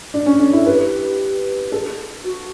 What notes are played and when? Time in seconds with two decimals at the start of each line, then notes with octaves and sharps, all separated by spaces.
0.14 D4
0.26 C#4
0.39 D4 A4
0.53 E4 A4
0.66 G4 B4
1.72 A4
2.24 F#4